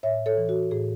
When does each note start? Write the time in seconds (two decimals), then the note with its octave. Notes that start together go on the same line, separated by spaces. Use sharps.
0.03 A2 C#5 E5
0.26 A4 C#5
0.37 E3
0.49 F#4
0.71 A2 G#4